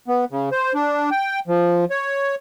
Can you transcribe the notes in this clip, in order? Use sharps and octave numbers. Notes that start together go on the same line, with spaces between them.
B3
C#3
C5
D4
G5
F3
C#5